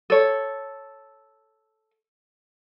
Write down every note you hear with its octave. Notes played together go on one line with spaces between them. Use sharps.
A4 C#5